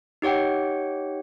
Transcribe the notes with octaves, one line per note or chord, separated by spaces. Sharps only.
D#4 G4 C#5 F#5 G5